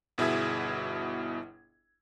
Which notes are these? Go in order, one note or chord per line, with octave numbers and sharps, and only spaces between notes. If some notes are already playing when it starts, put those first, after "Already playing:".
G1 B2 E4 G#4 E5 G#6